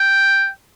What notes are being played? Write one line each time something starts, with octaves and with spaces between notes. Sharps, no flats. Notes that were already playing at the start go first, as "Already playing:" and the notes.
Already playing: G5